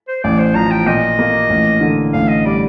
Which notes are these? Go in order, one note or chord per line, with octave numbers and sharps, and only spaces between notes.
C5
A1 D5
C5
F3 A#5
G5
A#2 D#5
A#3
A1
D3
A1 F5
D#5
G3 D5